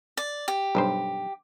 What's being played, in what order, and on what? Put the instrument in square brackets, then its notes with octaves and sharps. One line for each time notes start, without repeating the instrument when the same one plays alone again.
[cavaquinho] D5
G4
[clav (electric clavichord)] B1 G2 C5